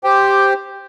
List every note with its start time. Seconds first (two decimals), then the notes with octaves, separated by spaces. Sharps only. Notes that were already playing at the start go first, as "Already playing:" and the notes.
0.04 G4 C5 G5